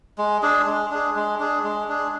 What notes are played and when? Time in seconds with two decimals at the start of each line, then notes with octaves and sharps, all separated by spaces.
0.18 G#3
0.43 D4 G#4
0.67 G#3
0.91 D4 G#4
1.16 G#3
1.40 D4 G#4
1.64 G#3
1.89 D4 G#4